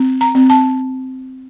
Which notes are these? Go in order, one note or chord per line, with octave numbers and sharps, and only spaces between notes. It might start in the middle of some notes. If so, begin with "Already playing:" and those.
Already playing: C4
A#5
C4
A5